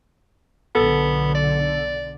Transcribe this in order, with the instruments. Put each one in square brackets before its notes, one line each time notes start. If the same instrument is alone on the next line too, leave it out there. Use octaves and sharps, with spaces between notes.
[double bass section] B1 D3 [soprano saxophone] B3 [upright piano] A4
[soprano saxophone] D5